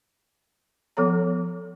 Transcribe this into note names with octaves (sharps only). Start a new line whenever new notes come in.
F3 B3 A4 C#5 A#5